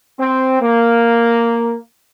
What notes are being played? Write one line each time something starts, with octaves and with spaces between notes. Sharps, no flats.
C4
A#3